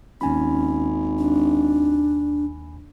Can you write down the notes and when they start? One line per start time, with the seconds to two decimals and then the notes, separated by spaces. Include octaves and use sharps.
0.21 G#1 D#2 C#4 G#5 B5
1.18 D4